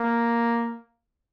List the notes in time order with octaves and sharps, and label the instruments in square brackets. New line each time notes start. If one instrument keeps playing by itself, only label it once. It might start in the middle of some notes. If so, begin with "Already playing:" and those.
Already playing: [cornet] A#3